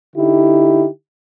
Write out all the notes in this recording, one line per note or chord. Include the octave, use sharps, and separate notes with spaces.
D3 D#4 E4 G4